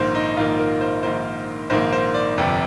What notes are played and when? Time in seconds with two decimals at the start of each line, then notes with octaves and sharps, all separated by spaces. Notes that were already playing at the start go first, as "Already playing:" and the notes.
Already playing: A#1 G#2 D#3 A#3 C5
0.15 D#4
0.37 A#1 G#2 D#3 A#3 F4
0.59 A#4
0.81 C5
1.03 A#1 G#2 D#3 A#3 C5
1.70 A#1 G#2 D#3 A#3 C5
1.92 C5
2.14 D5
2.38 G1 F2 C3